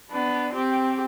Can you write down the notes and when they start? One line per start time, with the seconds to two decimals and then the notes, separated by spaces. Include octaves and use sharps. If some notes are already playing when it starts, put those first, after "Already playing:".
0.11 B3 D4
0.53 C4 G4